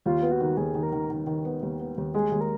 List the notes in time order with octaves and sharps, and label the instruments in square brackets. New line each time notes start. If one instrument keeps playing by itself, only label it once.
[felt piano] D#2 [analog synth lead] F4
[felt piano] B3
[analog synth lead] F#4
[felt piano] D#3
[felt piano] D#2 [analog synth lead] G#4
[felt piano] D#3
[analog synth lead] A#4
[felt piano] D#3
D#3
D#3
B3
D#2
B3
D#2
[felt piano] G#3 [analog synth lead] G#4
[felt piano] D#2
[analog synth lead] A#4